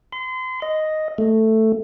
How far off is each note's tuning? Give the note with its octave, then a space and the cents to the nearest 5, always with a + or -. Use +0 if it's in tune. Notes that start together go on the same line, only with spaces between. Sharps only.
C6 -35
D#5 +0
A3 +5